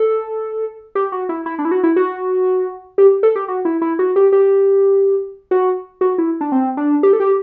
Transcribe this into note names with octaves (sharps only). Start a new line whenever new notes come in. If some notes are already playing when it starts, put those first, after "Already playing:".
Already playing: A4
G4
F#4
E4
E4
D4
E4
F#4
E4
F#4
G4
A4
G4
F#4
E4
E4
F#4
G4
G4
F#4
F#4
E4
D4
C4
D4
G4
A4
G4